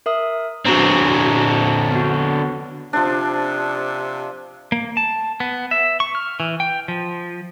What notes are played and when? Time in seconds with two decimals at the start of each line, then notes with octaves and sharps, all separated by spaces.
0.06 A#4 E5 D#6
0.66 D3 C4 F#4 A#5
1.91 B3 F#4
2.93 C3 F3 D4
4.72 A#3
4.97 A5
5.40 B3
5.71 E5
6.00 C#6
6.15 F6
6.40 E3
6.60 G5
6.88 F3